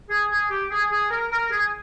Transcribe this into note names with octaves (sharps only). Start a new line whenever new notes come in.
G#4
G#4
G4
G#4
G#4
A#4
A#4
G#4